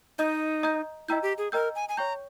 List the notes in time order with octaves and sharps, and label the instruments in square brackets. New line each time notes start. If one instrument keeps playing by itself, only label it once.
[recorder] D#4 [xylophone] D#5 A#5 D#6 G6
[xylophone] D#5 A#5 D#6 G6
[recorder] E4 [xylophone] D#5 G5 A#5 E6 G6
[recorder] G4
G#4
[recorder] A#4 [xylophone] D#5 G5 A#5 E6 G6
[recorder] G#5
G#5
[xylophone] C#5 G5 C#6 G6 [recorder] A#5